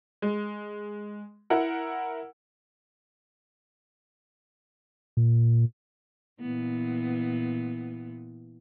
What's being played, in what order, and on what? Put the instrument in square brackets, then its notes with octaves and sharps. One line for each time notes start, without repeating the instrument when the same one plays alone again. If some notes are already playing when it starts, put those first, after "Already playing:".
[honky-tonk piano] G#3
E4 A#4 F#5
[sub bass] A#2
[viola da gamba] A#2 E3 B3